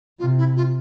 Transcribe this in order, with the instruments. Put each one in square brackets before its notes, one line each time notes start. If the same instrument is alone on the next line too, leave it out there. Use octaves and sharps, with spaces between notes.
[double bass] C3 [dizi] F4
[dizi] E4
F4